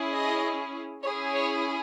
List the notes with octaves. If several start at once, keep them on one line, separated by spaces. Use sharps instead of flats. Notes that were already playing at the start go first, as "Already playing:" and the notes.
Already playing: C#4 E4 G#4
D#5
C#4 E4 G#4 C#5
C#5